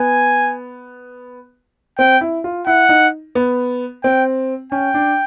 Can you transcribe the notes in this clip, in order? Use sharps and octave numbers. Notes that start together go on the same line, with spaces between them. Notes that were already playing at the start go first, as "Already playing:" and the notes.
Already playing: B3 G#5
C4 G5
E4
F4
E4 F#5
D#4
B3
C4 G5
C#4 G5
D4